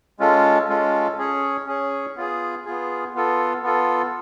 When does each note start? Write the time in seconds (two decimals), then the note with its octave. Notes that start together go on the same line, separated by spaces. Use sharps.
0.19 G#3 C#4 F4 A4
0.68 G#3 C#4 F4 A4
1.17 C#4 G#4 C#5
1.66 C#4 G#4 C#5
2.16 B3 F4 G#4
2.65 B3 F4 G#4
3.14 B3 F4 A4
3.63 B3 F4 A4